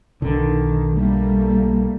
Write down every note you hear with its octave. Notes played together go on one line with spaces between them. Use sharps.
B1 D3 D#3
G3 A3 A#3